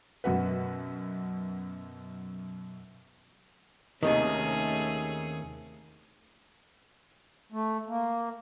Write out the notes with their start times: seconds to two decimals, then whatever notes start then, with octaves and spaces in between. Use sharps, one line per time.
0.24 F#2 B2 F#4 B4
4.03 D#2 C3 D#3 A3 C#4 G#4
7.52 A3
7.88 A#3